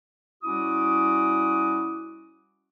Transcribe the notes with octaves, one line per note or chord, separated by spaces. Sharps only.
G3 C#4 E4 F#4 D6 D#6